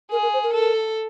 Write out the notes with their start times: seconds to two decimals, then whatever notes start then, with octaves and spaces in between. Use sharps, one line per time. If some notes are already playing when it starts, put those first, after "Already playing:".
0.11 G#4 A#4
0.23 A#4
0.33 C5
0.43 A#4
0.54 A4